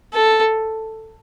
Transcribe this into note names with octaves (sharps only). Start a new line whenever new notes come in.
A4